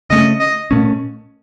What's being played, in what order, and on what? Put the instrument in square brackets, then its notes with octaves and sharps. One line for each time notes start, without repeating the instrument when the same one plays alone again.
[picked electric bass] C#3 A3 C#4 [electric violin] D#5
[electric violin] D#5
[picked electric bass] A#2 A3 C#4